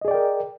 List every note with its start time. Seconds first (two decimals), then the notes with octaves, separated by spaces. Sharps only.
0.01 D#5
0.05 G#4
0.08 D5
0.11 G5
0.14 A#4